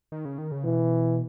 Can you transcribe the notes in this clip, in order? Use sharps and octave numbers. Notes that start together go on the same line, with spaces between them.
D#3
C#3
D#3
C#3
B2 E3